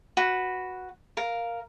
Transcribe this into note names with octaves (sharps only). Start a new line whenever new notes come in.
F#4 B4
A#4 F5